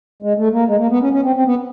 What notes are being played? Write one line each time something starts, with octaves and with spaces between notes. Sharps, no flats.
G#3
A3
A#3
G#3
A#3
B3
C#4
C#4
C4
C4
B3